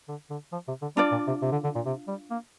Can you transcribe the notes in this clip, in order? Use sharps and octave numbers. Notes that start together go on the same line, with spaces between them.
D3
D3
F3
C3
D3
G3 D4 F4 D5
A#2
C3
C3
D3
D3
A#2
C3
G3
A#3